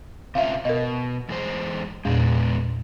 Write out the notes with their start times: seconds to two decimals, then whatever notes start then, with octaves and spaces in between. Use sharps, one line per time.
0.35 C3 C#4 F4 E5 F5
0.65 B2 A#4 D#5
1.29 E2 G#3 C5
2.05 E2 A#2 G#3 B3 D5